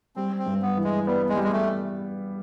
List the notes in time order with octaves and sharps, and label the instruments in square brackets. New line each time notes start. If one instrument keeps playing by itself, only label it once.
[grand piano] G3 [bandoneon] C4
[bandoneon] C4
[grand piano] G2
[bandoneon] B3
[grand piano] E3
[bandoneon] G#3
[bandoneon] G3 [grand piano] B3
[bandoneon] G#3
[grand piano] G3
[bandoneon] G#3
A3